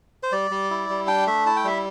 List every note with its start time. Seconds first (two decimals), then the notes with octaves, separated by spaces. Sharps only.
0.23 C5
0.32 G3 D5
0.51 G3
0.71 E4
0.90 G3
1.07 D4 G5
1.27 A3 E5
1.46 E4 A5
1.57 G5
1.64 G3 E5